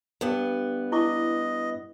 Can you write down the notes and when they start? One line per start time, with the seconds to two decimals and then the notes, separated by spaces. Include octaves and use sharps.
0.21 G2 B3
0.92 E4 D#5 C#6 D6